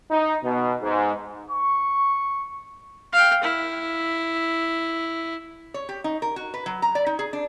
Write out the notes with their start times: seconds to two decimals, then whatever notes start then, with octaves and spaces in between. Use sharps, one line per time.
0.11 D#4
0.43 B2
0.81 G#2
1.51 C#6
3.13 F5 G5
3.43 E4
5.74 C#5
5.89 G4
6.04 D#4
6.22 A#4
6.36 F#4
6.54 B4
6.66 F#3
6.82 A#5
6.95 D5
7.06 D#4
7.19 G#4
7.33 D4